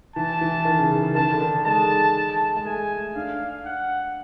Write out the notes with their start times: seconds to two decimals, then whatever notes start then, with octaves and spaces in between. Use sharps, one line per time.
0.15 E3 A5
0.41 E3
0.65 D#3
0.78 C#3
0.91 C#3
1.02 C#3
1.15 D#3 A5
1.31 D3
1.41 D#3
1.65 G#3 A5
2.57 G#3
2.65 A3 G#5
3.16 D4 F5
3.65 F#5